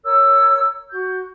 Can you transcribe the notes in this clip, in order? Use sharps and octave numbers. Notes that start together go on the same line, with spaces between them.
A#4 C#5 E6
F#4 G6